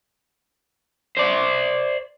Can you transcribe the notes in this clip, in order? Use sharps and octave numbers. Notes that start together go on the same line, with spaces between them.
C5 D5